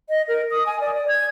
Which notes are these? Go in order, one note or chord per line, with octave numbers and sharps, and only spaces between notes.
D#5
A#4
D#6
G#5
D5
D5
G#6